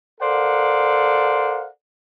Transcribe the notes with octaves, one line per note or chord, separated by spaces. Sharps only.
A4 A#4 C5 D5 F5 F#5